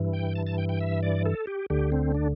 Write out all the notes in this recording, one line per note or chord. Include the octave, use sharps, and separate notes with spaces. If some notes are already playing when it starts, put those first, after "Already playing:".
Already playing: G2 E3
G5
A5
A5
G5
G5
E5
D5
A4
G4
D2 D3 G4
C4
D4